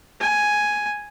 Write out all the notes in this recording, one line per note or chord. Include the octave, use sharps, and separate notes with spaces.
G#5